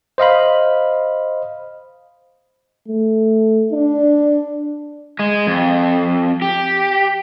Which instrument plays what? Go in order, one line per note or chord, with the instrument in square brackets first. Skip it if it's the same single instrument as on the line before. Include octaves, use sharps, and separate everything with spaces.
[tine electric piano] C5 D#5 F5 B5
[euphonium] A3
D4
[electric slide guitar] G#3
F2
G4